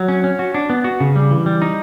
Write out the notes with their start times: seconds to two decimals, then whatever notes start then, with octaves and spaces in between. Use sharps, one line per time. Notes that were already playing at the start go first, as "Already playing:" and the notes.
Already playing: F#3
0.08 C#4
0.24 C#4
0.39 F#4
0.54 D4
0.70 B3
0.84 F#4
1.00 C#3
1.16 G3
1.31 E3
1.46 G3
1.62 D#4